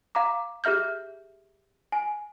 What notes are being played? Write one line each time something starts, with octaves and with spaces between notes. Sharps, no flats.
F5 A#5 D6
G4 G#4 E5 F6 G6
G#5